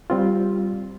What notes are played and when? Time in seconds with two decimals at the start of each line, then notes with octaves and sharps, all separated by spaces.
0.10 G3 C4 F4